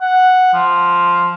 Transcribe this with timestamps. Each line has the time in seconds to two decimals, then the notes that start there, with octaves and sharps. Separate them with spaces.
0.01 F#5
0.53 F3